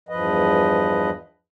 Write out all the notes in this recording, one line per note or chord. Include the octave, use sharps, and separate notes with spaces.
E2 G2 F3 B4 D#5